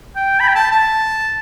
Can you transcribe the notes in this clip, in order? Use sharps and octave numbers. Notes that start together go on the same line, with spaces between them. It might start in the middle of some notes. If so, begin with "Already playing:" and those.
G5
B5
G5
A5
A5